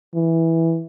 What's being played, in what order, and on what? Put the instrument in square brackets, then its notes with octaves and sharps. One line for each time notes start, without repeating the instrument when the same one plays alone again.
[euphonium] E3